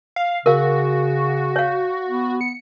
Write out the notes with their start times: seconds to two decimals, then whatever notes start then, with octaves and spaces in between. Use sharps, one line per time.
0.16 F5
0.46 C#3 F#4 A#4 F5
1.56 C#5 F5
2.08 B3
2.41 C#7